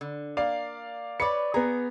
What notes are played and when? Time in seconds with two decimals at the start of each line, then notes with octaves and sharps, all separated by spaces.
0.01 D3
0.37 A#3 D5 F5
1.20 B4 C#5 D5 C#7
1.54 B3 G#4 A#5